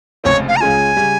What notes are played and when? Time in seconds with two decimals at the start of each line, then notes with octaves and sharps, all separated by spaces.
0.24 F1 F2 C#3 G#3 C4 C#5
0.48 F5
0.56 A#5
0.60 C#2 C#3 G#3 C#4 F4 G#5
0.96 C#3 G3